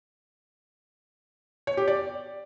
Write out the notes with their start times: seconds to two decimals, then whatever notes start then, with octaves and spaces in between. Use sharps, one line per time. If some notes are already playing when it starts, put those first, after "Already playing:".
1.67 C#5
1.77 G4
1.88 D5